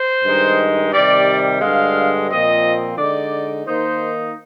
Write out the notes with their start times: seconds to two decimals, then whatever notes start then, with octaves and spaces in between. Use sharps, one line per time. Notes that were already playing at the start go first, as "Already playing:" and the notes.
Already playing: C5
0.24 G2 D#3 G#3 D#4
0.92 C3 D#3 G3 D5
1.61 G2 D3 G#3 F5
2.30 A#2 F3 C4 D#5
2.97 D3 G#3 D#4 D5
3.66 D#3 A#3 D#4 C5